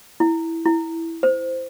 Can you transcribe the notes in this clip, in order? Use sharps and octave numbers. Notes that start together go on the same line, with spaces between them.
E4
E4
C5